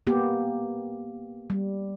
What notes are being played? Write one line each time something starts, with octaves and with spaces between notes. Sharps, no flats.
A#3 B3 G4
G3